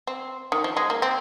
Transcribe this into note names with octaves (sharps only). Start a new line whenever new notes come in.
C4
D#3
F3
G#3
A#3
C4